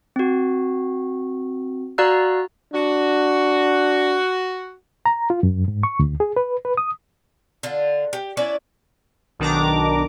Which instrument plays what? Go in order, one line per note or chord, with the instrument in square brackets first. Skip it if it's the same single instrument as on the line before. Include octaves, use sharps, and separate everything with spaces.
[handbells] C4 F#4
F#4 D5 F5 A#5 E6 F#6
[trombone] D4 [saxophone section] F#4
[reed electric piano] A#5
F4
F#2
G#2
C#6
D2
G#4
B4
B4
D#6
[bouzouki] D3 F4
G4
C#4 D4 E4 D5
[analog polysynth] B1 D#3 D4 A#5 D6